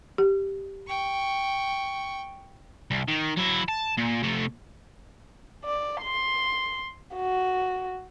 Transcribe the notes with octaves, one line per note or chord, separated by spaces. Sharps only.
G4
G5 C#6
C2
D#3
F#3 E4
A5
A#2
C3 A3
D5
C6
F#4